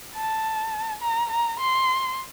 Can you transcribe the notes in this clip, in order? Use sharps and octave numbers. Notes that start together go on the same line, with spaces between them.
A5
A#5
A#5
C6